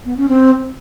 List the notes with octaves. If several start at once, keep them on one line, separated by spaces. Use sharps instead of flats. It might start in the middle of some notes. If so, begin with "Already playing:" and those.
B3
C#4
C4